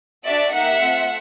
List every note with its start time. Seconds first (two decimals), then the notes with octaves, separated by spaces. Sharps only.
0.24 D4 F#4 A4 D5 E5
0.52 A#3 D#4 G4 E5 F#5
0.81 A3 C4 F4 A4